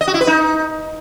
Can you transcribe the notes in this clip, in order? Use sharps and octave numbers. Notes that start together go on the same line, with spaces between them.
D#5
F#4
E4
B4
D#4